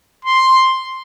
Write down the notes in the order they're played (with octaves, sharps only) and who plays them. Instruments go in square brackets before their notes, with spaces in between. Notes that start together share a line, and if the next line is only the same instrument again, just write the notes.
[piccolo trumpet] C6